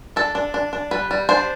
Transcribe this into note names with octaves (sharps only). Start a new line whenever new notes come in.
D4 A4
D4
D4
D4
G3 B4
G3
D4 C5